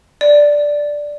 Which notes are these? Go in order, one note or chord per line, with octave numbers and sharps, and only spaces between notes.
D5